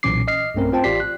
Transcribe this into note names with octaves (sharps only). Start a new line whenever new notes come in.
B1 A#2 E3 C#4 D6 C7
D#5 F6 C7
B1 G2 A3 C4 C#4 A#4
C4 F4 C5 G5 A5
A1 F4 G4 D5 B6 C7
F#6